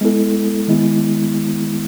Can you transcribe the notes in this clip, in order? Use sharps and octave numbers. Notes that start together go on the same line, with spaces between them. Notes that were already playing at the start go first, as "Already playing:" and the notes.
G#3 B3 E4 A4
D#3 G#3 B3 E4